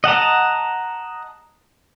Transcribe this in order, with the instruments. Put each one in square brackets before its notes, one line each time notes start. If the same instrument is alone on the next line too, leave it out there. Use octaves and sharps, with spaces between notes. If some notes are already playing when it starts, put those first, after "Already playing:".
[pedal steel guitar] D#5 F#5 A5 A#5